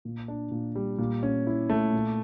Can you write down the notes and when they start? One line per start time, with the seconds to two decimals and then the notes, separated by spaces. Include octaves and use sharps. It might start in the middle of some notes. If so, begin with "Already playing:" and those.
0.05 A#2
0.28 D4
0.51 A#2
0.75 G3
0.98 A#2
1.23 C#4
1.47 E4
1.70 A3
1.93 A#2